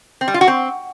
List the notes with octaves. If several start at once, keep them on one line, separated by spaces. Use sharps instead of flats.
C4
G3
F4
F#4
C4